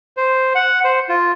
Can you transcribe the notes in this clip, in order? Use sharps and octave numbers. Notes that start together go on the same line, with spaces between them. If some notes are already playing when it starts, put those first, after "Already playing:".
C5
F#5
C5
F4